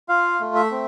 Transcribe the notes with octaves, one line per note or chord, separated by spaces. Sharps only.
F4 F5
A3
E5
C4